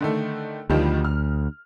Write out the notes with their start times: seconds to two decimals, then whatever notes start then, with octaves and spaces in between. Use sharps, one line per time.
0.01 D3 D#3 A3
0.70 D2 D#3 F3 G3
1.05 F6